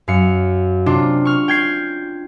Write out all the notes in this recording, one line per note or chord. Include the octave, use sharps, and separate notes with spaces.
F#2 F5 C#7
C3 D4 F4
C#6 F6
G5 G#6 C7